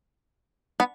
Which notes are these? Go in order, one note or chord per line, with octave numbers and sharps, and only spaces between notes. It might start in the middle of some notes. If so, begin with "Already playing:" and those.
B3